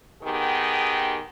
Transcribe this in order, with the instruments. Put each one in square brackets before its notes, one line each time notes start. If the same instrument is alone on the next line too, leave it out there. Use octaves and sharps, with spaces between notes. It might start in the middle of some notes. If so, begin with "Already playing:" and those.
[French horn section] D#3 B3 G4 G#4